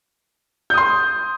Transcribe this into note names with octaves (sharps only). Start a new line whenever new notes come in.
C6 D#6 G6